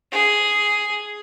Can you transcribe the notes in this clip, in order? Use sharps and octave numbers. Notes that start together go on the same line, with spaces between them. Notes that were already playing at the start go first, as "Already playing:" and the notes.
G#4